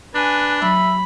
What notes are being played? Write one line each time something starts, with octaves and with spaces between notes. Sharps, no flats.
D4 B4 G#5
F#3 E5 B5